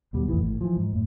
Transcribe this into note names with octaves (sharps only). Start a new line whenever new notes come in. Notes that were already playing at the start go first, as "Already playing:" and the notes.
D#2 B2 G3
F2 A2 D#3 E3
G#1 A2
E3 F3
G#2
F#2 A2